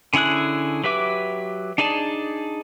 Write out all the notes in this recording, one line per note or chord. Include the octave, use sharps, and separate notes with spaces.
D3 C#4 E4 G#4 F#6
F#3 G4 B4 E5 D6
D4 D#4 G#4 D5 A5